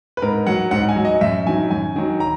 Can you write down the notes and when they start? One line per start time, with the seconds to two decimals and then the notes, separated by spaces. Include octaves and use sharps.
0.17 B4
0.22 G#2 A#4
0.47 F#3 F#5
0.71 G#2 F#5
0.89 G#5
0.96 F#3
1.05 D#5
1.21 F#2 E5
1.46 D#3 F#3 G#5
1.71 F#2 G#5
1.96 D#3 F#3
2.20 A#5